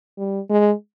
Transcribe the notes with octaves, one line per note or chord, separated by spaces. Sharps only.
G3
G#3